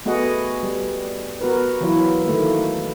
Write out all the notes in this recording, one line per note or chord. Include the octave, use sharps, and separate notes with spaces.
A3 B3 F#4 G#4 D#5 F#5
G3
B3 F#4 A#4 B4
E3 F#3 E4 F4
D#3 A3 A#3